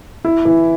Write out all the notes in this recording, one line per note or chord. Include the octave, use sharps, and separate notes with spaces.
E4
E3